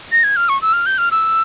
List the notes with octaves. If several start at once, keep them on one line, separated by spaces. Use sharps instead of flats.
A#6
G#6
F6
C#6
E6
F6
G6
F6
E6